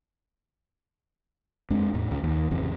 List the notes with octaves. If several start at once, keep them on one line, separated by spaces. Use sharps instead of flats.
F2 G#3 D4
E2 A2
C#2
D#2
A1 F2 C#3 E3